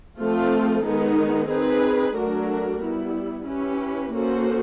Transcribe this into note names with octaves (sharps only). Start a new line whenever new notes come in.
F3 A3 C4 F4 A4
D#3 G#3 B3 D#4
C4 D#4 G#4 B4
F#3 A3 D4 F#4 A#4
G3 B3 E4
C#4 E4 G4 B4
A#3 C#4 F#4 A4 C5